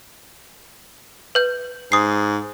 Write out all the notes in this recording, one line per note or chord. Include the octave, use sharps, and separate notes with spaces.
B4 G6
G#2 D#6 C7